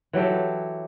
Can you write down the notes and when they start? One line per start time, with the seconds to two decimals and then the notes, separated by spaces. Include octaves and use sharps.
0.13 E3 F#3 G4 A4